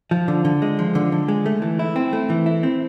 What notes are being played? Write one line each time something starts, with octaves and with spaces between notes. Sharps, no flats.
F3
D3
D3
G#3
F3
D3
D3
G#3
A3
E3
E4
C4
A3
E3
E4
C4